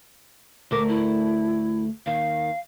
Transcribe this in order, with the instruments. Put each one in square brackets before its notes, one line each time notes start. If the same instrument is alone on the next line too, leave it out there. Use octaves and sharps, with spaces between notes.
[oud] D2 A3 A#4 [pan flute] D6
[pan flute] E4
[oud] D#2 D#3 [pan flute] F5